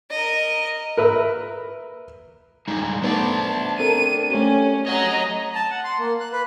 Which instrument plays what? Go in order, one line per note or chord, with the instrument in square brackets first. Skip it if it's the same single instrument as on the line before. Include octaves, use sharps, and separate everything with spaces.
[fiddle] A#4 D#5
[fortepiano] A#4 B4 E5
[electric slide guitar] G3 G#3 D#4
[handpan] A3 B3 B4 [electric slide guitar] D4 C5 D5 [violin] A5
[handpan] C4 A4 A#4 [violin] D#7
[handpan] A3 G4 [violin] C#4
[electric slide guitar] C#5 F#5 [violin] D#5 A#5
[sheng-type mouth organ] A5
F#5
C6
A#3
F#6
B4